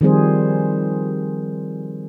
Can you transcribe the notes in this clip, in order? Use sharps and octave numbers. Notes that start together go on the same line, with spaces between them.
D#3 F3 G3 C4 G#4 C5